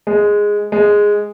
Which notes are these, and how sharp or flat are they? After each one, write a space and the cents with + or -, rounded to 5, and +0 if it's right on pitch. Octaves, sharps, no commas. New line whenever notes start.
G#3 -5
G#3 -5